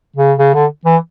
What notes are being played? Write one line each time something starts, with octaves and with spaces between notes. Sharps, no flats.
C#3
C#3
D3
E3